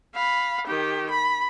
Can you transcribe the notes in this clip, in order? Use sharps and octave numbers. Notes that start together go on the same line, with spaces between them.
F5 B5
D#3 G4
B5